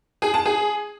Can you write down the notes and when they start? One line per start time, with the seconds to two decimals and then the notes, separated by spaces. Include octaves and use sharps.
0.22 G#4
0.34 A5
0.46 G#4